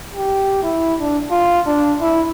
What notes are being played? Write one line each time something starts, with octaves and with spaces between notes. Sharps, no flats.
G4
E4
D4
F4
D4
E4